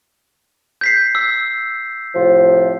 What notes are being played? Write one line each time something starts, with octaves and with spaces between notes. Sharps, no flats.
G6 B6 C7
E6
A2 C3 F3